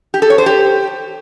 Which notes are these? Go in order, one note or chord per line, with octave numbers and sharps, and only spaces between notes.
G4
A4
C#5
C5
G4